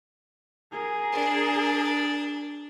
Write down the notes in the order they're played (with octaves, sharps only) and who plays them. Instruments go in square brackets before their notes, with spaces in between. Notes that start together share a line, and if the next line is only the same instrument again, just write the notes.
[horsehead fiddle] G#4 A#4
[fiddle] D4